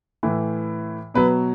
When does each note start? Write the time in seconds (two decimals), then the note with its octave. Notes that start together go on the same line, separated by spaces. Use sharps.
0.23 A2 E3
1.14 B2 F#3 B4